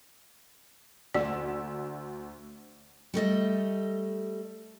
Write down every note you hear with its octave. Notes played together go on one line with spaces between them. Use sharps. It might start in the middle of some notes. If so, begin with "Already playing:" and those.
D2 D5 E6
G3 A3 D#5 E5